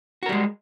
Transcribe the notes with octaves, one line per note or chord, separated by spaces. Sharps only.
G3 G#3 F#4 A#4